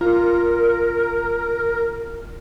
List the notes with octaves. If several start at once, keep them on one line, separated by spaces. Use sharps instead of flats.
F4 A#4